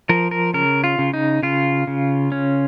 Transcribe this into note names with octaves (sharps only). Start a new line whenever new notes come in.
F3 A#4
A#4
C#3 A#4
F4
C#3
D#4
C#3 F4
C#3
C#4